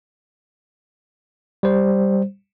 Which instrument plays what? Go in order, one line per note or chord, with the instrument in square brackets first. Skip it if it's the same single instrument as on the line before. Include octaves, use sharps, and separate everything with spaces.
[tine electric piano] G3 C5